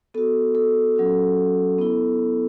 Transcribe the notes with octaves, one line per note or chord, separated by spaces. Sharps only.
B3 F#4 A4
A4
F#3 C#4 F#4
B3 E4